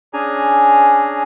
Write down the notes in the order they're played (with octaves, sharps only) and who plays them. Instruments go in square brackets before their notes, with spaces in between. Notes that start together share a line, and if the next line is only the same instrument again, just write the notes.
[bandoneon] C#4 D4 G#4 G#5 A#5